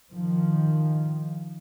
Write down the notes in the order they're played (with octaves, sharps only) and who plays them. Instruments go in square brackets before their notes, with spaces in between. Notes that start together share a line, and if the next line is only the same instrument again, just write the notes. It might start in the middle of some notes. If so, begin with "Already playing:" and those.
[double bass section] D#3 F3